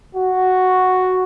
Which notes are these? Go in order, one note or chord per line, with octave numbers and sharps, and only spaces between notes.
F#4